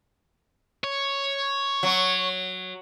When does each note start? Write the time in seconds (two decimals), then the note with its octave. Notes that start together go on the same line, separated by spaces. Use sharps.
0.84 C#5
1.83 F#3